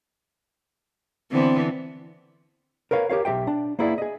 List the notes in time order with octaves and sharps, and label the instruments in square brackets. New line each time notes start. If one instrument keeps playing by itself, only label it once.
[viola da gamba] D3 E3 B3 [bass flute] C4
[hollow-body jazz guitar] A#4 B4 C#5 F5
G4 A#4 C#5 F5
B1 F#3 G4 E5 G5
D4 A5
A#3 B3 E4 G#4 D5
G#4 D#5